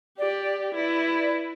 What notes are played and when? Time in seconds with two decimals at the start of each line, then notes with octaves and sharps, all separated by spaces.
0.18 G4 D5
0.75 E4 B4 D5